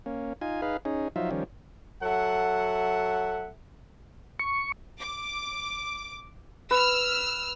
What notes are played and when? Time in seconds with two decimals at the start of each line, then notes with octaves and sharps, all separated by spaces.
0.06 A#3 C#4
0.41 D#4 F4 G#5
0.62 D#4 G#4 B4 F5
0.85 C#4 D#4 G#4
1.16 F3 F#3 D#4 F4 E5
1.31 D#3 F3 G3 C#4
2.03 F#3 A4 E5 F#5
4.39 C#6
5.01 D6
6.71 B4 E6 F6